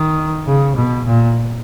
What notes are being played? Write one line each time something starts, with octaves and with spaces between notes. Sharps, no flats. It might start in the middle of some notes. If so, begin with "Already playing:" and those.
Already playing: D#3
C#3
B2
A#2